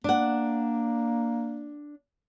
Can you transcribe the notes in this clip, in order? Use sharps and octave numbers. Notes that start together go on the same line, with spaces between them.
A#3 D4 F#5